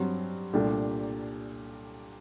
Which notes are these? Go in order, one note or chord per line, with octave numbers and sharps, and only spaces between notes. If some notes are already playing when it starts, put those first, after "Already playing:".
Already playing: G2 F#3 C4
C2 A#2 A3 D4 G4